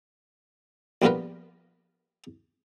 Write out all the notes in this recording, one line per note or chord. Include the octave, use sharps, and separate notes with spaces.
A#1 G3 B3 F4 A#4 B4